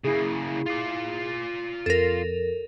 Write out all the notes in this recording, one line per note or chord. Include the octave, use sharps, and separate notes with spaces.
C#3 A#3 E4 G#4
F4 D5
F2 A4 A#4